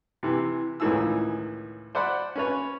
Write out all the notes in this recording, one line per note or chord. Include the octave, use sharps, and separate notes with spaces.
C3 E3
C#2 A2 D#3 E3 G#4 E6
C5 D5 F#5 B5
C#4 B4 C#5